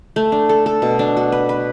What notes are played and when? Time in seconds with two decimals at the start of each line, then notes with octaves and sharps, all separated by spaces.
0.16 A3
0.32 D4
0.49 A4
0.66 A4
0.82 B2
0.99 D4
1.17 F#4
1.32 B4
1.49 B4